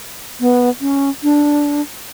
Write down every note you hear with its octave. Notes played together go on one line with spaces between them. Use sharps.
B3
C#4
D4